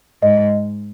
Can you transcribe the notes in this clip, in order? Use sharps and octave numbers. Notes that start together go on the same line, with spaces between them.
G#2 D#5